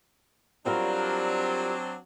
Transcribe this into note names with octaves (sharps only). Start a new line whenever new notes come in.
F#3 G3 C4 D4 F4 A#4